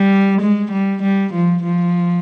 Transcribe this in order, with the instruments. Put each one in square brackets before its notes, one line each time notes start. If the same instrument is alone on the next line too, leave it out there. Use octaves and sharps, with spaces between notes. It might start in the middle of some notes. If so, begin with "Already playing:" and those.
Already playing: [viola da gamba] G3
G#3
G3
G3
F3
F3